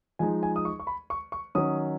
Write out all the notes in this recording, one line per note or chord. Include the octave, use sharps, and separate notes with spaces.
F3 G#3 D#4 G#5
G#5
D#6
C#6
C#6
B5
C#6
C#6
D#3 F#3 C#4 D#6